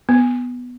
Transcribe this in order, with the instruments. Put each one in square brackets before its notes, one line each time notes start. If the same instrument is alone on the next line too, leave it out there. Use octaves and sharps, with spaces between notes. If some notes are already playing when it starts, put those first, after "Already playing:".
[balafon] B3